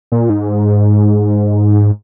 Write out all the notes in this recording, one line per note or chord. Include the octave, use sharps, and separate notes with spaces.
A#2
G#2